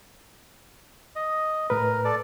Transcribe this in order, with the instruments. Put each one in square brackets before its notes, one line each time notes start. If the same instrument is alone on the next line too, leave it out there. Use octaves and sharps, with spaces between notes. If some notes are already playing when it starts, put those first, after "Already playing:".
[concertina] D#5
[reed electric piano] A2 B4 [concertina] A#4
[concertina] A4 D5